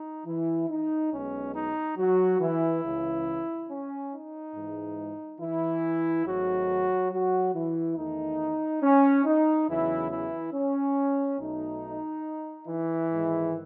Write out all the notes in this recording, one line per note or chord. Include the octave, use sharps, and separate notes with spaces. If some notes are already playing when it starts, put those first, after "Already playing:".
Already playing: D#4
E3 E4
D#4
B1 B2 G#3 C#4
D#4
F#3 F#4
E3 E4
C#2 C#3 E3
C#4
D#4
G#2 E3 G#3
E3 E4
G#1 G#2 D#3 F#3 A3 F#4
F#3 F#4
E3 E4
E2 D#3 A3 D#4
C#4
D#4
E2 C#3 E3 F#3 E4
E3 E4
C#4
B1 B2 A3 D#4
E3 E4
G#2 D#3 G#3